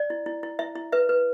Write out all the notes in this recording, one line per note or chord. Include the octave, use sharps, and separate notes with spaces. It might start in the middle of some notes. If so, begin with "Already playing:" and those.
Already playing: D5
E4
E4
E4
E4 E5
E4
B4 E5
B4